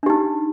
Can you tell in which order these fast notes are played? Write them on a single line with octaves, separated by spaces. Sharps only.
D4 G4 D#4